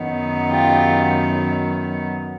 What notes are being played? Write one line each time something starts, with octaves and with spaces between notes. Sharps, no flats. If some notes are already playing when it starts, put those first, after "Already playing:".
Already playing: F#2 D#3 F#3 B3 D#4
F4 G4